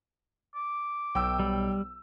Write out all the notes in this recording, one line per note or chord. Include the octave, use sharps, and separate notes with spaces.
D6
B1 G5 E6
G3